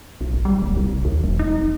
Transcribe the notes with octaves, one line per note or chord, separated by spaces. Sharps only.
B1
G#1
G3
D#1
C2
C2
D#2
E1
D#4
F1